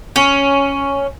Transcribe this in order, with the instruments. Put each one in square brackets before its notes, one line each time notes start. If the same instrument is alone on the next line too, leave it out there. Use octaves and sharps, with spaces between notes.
[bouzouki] C#4